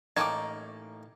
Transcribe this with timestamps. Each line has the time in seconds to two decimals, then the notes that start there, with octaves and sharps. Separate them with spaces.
0.17 A1 A#3 D#4 C#5 G5 A5 D6 G#6